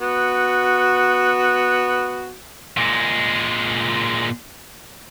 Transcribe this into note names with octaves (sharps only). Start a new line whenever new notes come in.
B3 F#4
A#2 G#3